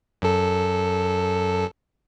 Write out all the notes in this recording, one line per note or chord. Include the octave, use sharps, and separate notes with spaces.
F#2 A4